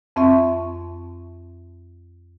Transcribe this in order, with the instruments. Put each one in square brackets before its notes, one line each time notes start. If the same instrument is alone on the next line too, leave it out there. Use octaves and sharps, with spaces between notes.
[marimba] F2 C4 E5 C#6